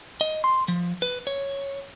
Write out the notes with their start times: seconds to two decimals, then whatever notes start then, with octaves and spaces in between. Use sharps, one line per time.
0.21 D#5
0.44 C6
0.68 F3
1.02 B4
1.27 C#5